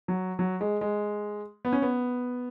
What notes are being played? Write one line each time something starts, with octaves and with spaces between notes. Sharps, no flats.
F#3
F#3
G#3
G#3
B3
C#4
B3